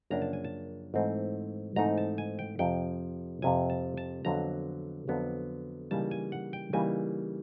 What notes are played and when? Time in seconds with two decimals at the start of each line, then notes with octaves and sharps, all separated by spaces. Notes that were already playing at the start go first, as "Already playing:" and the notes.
0.10 F#2 C#3 F3 A#3 D4 A#5
0.22 A5
0.33 G#5
0.44 A5
0.94 G#2 E3 A3 C4 D#4
1.76 G#2 E3 A3 C4 D#4 A#5
1.98 A5
2.18 G#5
2.39 G5
2.59 F2 C3 F3 G5
3.42 F2 C3 F3 G#5
3.70 A5
3.97 A5
4.25 F2 D3 F#3 B3 A#5
5.08 F2 D3 F#3 B3
5.91 C#3 E3 G3 A#3 D#4 A5
6.11 G#5
6.32 F#5
6.53 G5
6.73 C#3 E3 G3 A#3 D#4 G#5